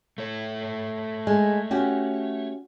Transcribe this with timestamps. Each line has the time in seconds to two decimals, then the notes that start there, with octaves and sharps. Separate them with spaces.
0.18 A3 C#5
1.27 G#3
1.71 C#4 F#4 G4